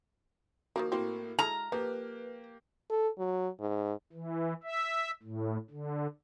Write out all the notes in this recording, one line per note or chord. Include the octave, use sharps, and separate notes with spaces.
D#3 F3 A#3 F#4 A#4
A2 A#3 C4 F#4
G#3 E4 A4 A#5 F6
F3 A#3 G4 B4
A4
F#3
G#2
E3
E5
A2
D3